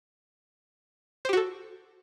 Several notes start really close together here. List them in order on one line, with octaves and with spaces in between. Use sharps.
C5 G4 F#4 A4